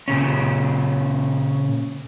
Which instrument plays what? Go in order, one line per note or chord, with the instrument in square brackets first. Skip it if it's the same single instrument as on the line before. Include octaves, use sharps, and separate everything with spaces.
[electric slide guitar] A#2 C#3 C#4